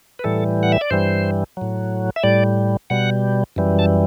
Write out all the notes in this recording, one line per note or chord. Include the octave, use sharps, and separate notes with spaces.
B4
A2 E3 G3 A4
F#5
E5
D5
G2 E3 G3 C5
A2 F#3
E5
A2 G3 D5
B2 G3 F#5
F#2 E3 G3
A5